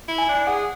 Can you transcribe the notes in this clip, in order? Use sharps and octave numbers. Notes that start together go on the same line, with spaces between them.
E4
G#5
D4
G#4 F#5